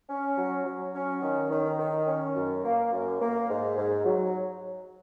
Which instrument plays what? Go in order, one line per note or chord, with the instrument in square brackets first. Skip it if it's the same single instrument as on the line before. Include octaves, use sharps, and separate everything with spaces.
[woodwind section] C#4
F#3
F#3
C#4
D#3
D#3
D#3
C#4
F#2
A#3
F#2
A#3
G#2
G#2
F#3